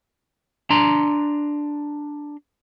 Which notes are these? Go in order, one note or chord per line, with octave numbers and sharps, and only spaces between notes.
D4 A#5 C6